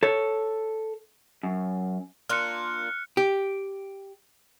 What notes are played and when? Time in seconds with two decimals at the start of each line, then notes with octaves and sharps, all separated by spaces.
0.03 A4 C#5
1.43 F#2
2.29 A#3 D4 F4 F6 F#6 C#7
3.17 G4